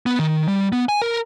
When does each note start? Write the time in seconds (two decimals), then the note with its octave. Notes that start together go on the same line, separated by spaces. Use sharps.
0.06 B3
0.19 D#3
0.48 G3
0.72 B3
0.89 G#5
1.02 A#4